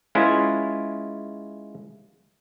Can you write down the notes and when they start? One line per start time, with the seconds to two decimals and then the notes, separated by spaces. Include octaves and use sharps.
0.15 G#3 C#4 E4 F4 B4 G#5